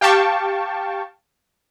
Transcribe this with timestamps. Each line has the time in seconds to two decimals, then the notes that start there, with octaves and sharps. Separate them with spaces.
0.01 G4 F5 G5 A5 C#6